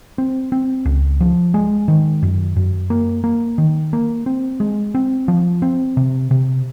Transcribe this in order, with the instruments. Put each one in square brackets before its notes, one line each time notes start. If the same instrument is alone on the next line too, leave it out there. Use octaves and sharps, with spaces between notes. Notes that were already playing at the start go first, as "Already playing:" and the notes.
[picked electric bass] C4
C4
C#2
F3
G#3
D#3
F#2
F#2
A#3
A#3
D#3
A#3
C4
G#3
C4
F3
C4
C3
C3